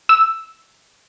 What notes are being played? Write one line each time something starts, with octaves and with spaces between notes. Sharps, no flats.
E6